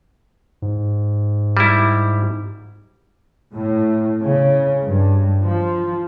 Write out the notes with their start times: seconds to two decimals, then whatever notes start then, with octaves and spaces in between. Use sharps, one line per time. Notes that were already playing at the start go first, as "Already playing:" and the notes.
0.62 G#2
1.57 G3 E4
3.54 A2
4.22 C#3
4.84 G2
5.43 F3